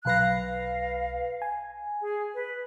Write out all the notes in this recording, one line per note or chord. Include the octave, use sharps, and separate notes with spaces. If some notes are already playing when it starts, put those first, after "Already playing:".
B1 B4 F5 F#6 A#6
F5
G#5
G#4
B4